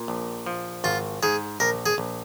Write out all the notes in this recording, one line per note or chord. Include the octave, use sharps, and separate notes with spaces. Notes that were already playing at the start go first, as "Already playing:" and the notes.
Already playing: A#2
A#1
F3
G#1 F4
G#2 G#4
A#1 A#4
G#4
A#1